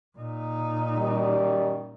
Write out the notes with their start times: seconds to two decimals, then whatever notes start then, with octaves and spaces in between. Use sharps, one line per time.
0.18 A#2 D#4
0.96 F#2 D#3 G3